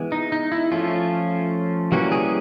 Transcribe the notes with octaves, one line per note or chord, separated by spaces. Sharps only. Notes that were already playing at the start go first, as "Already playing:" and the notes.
Already playing: E3 G#3 B3
D#4
D#4
E4
F3 A3 C#4 F4
E3 G3 A#3 C#4 F#4
G#4